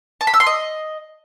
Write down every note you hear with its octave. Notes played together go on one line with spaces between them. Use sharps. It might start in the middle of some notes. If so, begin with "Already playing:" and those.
A5
B5
E6
C6
D#5